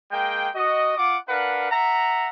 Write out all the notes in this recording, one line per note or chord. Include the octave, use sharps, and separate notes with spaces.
G#3 A#3 G5
F#4 D#5
F4 F#5 D6
D4 A#4 B4 F5 F#5
E5 F#5 A#5